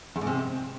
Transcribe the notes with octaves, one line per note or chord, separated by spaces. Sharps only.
E2
G#2
C3